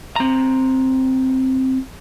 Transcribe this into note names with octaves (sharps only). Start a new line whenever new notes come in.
C4 A#5